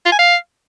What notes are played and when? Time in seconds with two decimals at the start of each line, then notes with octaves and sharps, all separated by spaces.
0.05 F4
0.12 G#5
0.19 F5